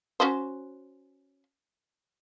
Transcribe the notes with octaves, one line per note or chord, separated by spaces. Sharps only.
C#4 F#4 C5